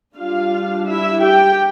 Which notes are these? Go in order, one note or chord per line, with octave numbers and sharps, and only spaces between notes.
G3 D4 F4 F5
E4 E5
G4 G5